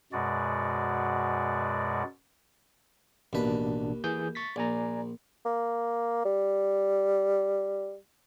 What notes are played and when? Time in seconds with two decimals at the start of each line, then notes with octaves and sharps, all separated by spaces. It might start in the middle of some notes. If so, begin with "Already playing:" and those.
0.13 F#2 B2 G#3 F#4 D5
3.33 A1 D#2 B2 D4 B4
4.04 E3 G#4 G6
4.35 C#6 A6 B6
4.56 A#1 D5 G#5 A#5
5.46 A#3
6.25 G3